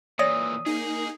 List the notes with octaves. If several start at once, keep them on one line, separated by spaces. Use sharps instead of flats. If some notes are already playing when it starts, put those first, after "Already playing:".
A#2 E3 C#5 D5 D#6 A#6
A#3 D#4 G#4